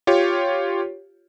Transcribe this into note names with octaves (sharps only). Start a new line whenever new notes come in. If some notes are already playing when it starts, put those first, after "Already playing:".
F4 G4 C#5